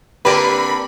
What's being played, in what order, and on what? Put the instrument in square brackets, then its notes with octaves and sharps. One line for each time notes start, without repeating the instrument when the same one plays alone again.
[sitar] D3 A#4 D5 [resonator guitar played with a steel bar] A#3 B4 [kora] C4 G4 [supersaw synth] B5